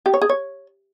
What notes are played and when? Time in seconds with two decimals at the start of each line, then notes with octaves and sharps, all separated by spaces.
0.06 G4
0.14 C#5
0.22 G#4
0.29 C#5